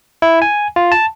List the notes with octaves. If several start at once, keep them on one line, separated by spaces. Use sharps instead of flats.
E4
G#5
F4
A5